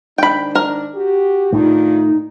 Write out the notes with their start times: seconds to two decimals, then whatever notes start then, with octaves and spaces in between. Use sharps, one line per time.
0.18 G#2 D#3 D4 G5 B5
0.55 A#4
0.95 F#4 G4
1.52 A2 D#3 A3 D4 D#4 F4